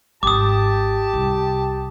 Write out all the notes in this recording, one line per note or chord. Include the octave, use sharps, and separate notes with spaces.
G#1 G4 A5 D6 D#6
C2